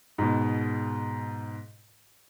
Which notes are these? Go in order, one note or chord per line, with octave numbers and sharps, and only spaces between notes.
G#2 B2